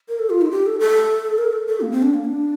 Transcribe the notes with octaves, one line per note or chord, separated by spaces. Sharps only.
A#4
A4
F4
D#4
G4
A4
A4
A#4
A4
A4
A#3
C4
D4
A#3
D4